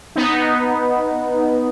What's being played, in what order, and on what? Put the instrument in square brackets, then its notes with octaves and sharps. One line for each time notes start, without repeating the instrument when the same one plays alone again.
[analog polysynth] B3 D#4